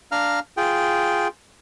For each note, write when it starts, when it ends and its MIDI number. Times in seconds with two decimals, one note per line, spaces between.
0.12 0.39 62
0.12 0.39 77
0.12 0.39 82
0.12 0.39 89
0.57 1.28 65
0.57 1.28 68
0.57 1.28 79